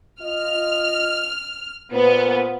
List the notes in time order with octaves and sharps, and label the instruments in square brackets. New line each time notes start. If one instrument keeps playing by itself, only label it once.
[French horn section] F4 D#5 [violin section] F6
[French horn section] A#2 C5 [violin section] B3